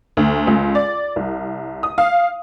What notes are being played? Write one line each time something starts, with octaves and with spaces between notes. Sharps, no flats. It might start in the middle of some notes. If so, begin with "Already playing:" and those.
D2
C#2
D5
C2
D#6
F5